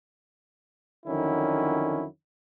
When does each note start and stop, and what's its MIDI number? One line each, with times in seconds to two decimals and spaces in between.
1.07 2.05 41
1.07 2.05 50
1.07 2.05 51
1.07 2.05 54
1.07 2.05 61
1.07 2.05 64